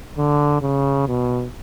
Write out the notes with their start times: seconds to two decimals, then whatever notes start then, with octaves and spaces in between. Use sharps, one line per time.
0.18 D3
0.61 C#3
1.07 B2